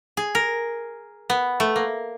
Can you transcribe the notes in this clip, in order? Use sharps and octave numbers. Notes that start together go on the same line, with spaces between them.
G#4
A#4
B3
A3
A#3